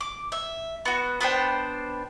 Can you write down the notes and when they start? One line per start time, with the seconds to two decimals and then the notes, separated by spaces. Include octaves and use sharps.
0.01 D6
0.32 E5
0.85 B3 F#4
1.21 B3 D4 C5 G5